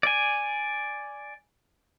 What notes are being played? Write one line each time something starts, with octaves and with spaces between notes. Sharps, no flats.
D5 G#5